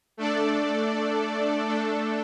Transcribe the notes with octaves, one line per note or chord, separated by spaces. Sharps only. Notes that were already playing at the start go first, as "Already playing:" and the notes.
A3 D4 A4 D5
A3 D4 A4